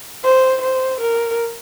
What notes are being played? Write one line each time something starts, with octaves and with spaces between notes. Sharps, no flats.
C5
C5
A#4